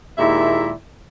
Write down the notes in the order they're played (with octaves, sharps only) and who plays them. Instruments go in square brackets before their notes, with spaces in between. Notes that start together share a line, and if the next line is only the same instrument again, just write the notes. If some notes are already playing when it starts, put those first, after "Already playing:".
[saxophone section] D#2 A#2 G#3 E4 E5